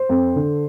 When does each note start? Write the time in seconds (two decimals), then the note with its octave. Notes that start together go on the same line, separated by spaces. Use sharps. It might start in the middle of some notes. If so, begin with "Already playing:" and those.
Already playing: C5
0.09 F2
0.36 D3